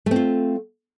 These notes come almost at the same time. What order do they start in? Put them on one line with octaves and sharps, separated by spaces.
A3 C4 F4